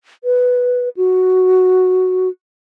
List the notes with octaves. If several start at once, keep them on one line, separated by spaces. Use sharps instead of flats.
B4
F#4